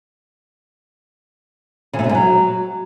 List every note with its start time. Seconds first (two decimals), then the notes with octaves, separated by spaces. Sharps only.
1.93 C#3
1.99 A2
2.04 B2
2.09 G#2
2.15 F#3